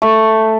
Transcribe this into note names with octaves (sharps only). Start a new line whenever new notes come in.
A3